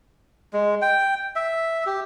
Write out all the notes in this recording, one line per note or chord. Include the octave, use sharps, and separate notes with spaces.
G#3
G5
E5
G4